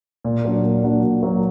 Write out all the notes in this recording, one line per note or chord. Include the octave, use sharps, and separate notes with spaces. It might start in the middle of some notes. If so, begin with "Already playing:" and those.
A#2
F#3 A#3 D4 F#4
A#2
F#3 A#3 D4 F#4
A#2
F#3 A#3 D4 F#4